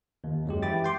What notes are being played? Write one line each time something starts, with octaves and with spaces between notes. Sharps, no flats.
D#2
F#2 F#3 G#3 G4
E3 E4 G4 D6 A6
G5 C6 D6